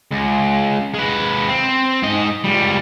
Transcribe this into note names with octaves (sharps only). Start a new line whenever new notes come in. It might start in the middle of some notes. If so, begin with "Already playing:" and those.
C#2
G#3 B4
C4
G#2 D#5
C#2 G3